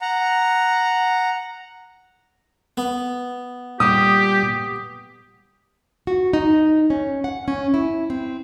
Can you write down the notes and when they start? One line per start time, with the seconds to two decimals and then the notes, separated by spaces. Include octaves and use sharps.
0.01 F#5 A#5
2.77 B3
3.80 A#2 G3 G4 D#6
6.07 F#4
6.33 D#4
6.90 C#4
7.24 F#5
7.48 C#4
7.74 E4
8.10 C4